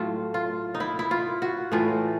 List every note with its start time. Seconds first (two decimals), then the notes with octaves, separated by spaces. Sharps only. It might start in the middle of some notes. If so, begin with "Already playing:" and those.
Already playing: A2 F#3 A3 F4
0.34 F4
0.74 D#4
0.80 E4
0.99 E4
1.11 F4
1.42 F#4
1.72 A2 E3 A3 F4